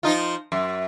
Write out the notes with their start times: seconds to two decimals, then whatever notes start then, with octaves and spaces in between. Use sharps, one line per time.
0.03 F3 D#4 F4
0.52 F#2